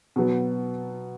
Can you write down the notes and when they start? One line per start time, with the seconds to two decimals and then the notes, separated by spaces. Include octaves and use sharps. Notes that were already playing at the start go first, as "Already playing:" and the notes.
0.16 B2 F#3 B3